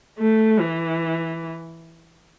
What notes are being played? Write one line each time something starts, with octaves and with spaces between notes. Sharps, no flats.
A3
E3